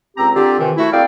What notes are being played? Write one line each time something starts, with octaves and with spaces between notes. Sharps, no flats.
C#2 C4 G4 A#5
D3 C4 F4 G4
C3 D#3 E3
A3 E4 F#4
A#3 C4 G#4 D5 F5 G5